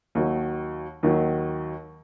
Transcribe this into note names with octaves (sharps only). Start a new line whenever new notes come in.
D#2 D#3 F#3
D#2 D#3 F#3